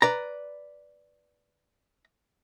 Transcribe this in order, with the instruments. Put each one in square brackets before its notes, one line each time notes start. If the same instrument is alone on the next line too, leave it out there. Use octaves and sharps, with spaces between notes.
[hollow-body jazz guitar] B4 D5 A#5